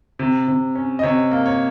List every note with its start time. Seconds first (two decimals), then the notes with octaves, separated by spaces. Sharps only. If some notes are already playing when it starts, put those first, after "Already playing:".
0.19 C3
0.48 C3
0.75 C#4
0.99 D#5
1.03 C3 C#5
1.31 A#3
1.46 C#5